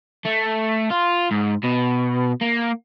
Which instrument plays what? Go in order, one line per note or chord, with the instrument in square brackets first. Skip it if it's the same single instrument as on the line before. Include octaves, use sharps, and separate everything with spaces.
[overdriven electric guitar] A3
F4
G#2
B2
A#3